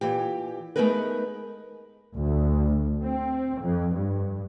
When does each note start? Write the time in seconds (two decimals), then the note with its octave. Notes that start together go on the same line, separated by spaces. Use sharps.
0.01 A#2 E3 G4
0.76 G#3 A3 B3 D#4 A#4 B4
2.15 D2
3.02 C4
3.61 F2
3.92 G2